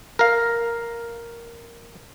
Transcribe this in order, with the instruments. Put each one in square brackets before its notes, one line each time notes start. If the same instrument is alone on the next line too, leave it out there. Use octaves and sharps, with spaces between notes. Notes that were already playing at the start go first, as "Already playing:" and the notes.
[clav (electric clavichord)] A#4 F5